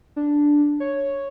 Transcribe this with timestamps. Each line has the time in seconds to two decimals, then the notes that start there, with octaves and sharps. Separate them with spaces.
0.16 D4
0.80 C#5